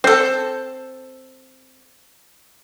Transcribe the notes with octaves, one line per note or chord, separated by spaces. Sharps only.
C4 A4 C5